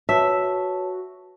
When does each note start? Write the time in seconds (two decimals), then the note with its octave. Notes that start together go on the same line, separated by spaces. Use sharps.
0.09 F#4 B4 C#5 E5 A5